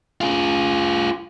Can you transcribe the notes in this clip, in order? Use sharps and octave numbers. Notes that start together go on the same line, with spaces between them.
F4 G#4